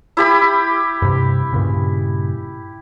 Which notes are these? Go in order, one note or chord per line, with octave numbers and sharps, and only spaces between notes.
E4 G4 B5
G2 C3
G2 A#2 C#3